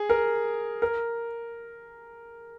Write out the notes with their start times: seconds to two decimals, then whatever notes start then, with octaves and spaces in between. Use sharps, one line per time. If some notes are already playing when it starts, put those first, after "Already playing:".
Already playing: G#4
0.10 A#4
0.82 A#4